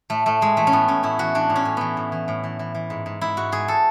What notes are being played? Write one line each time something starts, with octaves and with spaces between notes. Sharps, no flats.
A2 A3
A2 A3
A2 G#3
E3 A3
C#4
A2 B3
A2 C#4
A2 E4
E3 F#4
E3 D4
A2
C#4
A2
E3 B3
A2
E3
A2
E3
E3
E3
G#2
G#2
G#2 E4
G#2 F#4
G#2 G#4
A4